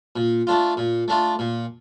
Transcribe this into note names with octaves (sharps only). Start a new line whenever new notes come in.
A#2
A3 D4 F4
A#2
A3 D4 F4
A#2